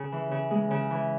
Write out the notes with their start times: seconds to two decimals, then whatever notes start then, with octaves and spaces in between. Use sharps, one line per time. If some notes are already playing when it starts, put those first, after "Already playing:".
Already playing: C#3
0.12 E3
0.31 C#3
0.51 G#3
0.71 C#3
0.90 E3